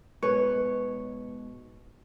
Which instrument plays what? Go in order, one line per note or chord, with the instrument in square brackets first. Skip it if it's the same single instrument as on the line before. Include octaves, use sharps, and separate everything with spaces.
[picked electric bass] G#2 B2 [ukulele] B4 [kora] C#5